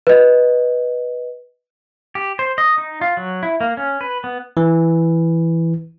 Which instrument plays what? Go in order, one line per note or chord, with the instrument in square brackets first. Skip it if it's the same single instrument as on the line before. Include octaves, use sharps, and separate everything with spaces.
[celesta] B4 D#5
[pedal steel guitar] G4
C5
D#5
D#4
F4
F#3
E4
A#3
C#4
B4
B3
[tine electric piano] E3